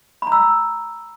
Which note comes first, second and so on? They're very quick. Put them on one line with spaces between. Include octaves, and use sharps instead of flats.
B5 A#5 E6